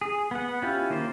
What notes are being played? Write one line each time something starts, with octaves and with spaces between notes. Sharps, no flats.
G#4
B3 F#5
C#4 E4 F4 G4
D#3 A#3 C#4 F4 C5